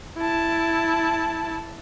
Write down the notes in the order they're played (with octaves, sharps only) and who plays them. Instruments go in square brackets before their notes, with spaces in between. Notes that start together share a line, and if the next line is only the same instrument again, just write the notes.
[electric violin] E4 A5